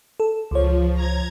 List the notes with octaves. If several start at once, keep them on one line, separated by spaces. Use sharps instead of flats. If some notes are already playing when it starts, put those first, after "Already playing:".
A4
C#2 F3 C#5
A#5 G#6